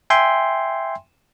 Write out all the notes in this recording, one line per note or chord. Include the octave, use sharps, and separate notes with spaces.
E5 G5 G#5 C6